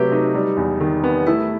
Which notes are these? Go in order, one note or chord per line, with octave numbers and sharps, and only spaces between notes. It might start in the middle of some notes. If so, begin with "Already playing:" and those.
Already playing: C3 F#3 A3 G4 B4
D#4
G3
E2
D#3
B3
A3 E4